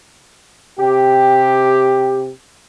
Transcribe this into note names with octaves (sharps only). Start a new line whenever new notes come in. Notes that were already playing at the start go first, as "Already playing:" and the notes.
C3 G4